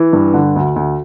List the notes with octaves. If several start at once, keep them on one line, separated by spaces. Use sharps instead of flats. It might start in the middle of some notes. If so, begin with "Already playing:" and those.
Already playing: E3
G2
D3
D2
D2